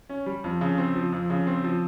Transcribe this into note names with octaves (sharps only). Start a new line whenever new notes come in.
C#4
G3
F2
C#3
C4
F3
F2
C#3
C4
F3